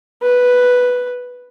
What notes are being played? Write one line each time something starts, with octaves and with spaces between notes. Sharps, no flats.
B4